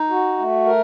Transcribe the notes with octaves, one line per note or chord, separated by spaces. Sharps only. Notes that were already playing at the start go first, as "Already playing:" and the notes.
Already playing: D#4
F#4
A3
A#4